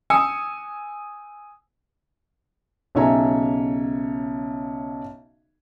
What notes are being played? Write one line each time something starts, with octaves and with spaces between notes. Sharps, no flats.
G#5 D#6 E6 C#7
B1 C#3 C#5 E5 G#5 A#5